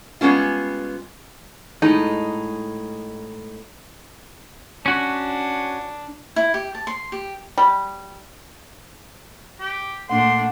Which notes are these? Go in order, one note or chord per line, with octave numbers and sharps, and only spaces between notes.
G3 G#3 B3 C#4 F4
A2 G#3 D#4
C#4 D4 F#4
E4
G4
A5
C6
G4
G3
G4
A#2 A3 D4 F#5 C6